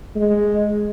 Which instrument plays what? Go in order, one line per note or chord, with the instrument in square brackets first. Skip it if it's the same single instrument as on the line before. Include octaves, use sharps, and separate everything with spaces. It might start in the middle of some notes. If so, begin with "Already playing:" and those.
[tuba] G#3